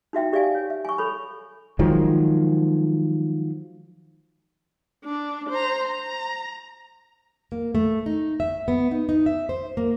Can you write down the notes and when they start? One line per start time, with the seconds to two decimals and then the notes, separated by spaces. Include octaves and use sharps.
0.13 D#4 F#4 E5 G5
0.33 G4 D5 E5 F5 G#5
0.55 C#5
0.70 E5
0.85 G#5 C#6
0.98 A4 C#5 B5
1.79 D#3 F3 F#3 G#3
5.04 D4
5.50 C5 A#5
5.87 A#5
7.52 A#3
7.75 A3
8.06 D#4
8.40 E5
8.68 B3
8.91 D#4
9.09 D#4
9.26 E5
9.49 C5
9.77 A#3